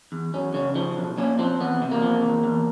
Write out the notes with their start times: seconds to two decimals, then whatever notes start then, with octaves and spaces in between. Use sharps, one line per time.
0.12 E2
0.34 F#2 C#4
0.54 C#3 C#4
0.75 F3 C#4
0.97 B1
1.18 A#2 C#4
1.39 F3 C4
1.60 E2 B3
1.82 C3
1.91 A#3
2.02 F3
2.24 E2
2.44 E2